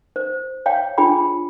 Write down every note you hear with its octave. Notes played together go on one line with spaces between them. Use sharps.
C5
C#5 F5 G5
D4 F4 G#4 G5 B5